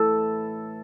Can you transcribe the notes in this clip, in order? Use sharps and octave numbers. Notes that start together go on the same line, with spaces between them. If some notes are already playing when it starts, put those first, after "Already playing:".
Already playing: A2 E3 A4